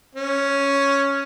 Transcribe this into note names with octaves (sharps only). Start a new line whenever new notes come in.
C#4